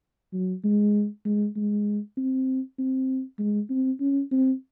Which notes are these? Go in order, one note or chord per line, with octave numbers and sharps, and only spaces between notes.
F#3
G#3
G#3
G#3
C4
C4
G#3
C4
C#4
C4